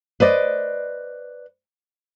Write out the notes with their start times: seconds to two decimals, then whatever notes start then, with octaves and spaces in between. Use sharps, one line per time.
0.20 B4 C5 D5 D#5